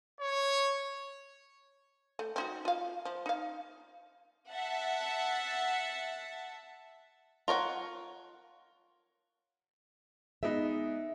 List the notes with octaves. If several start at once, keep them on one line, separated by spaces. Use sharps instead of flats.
C#5
A3
C4 D#4 F#4
F4 F5
F3
D#4 F5
E5 F#5 A5
F4 A#4 C#5 F#5
G#3 B3 D#4 E5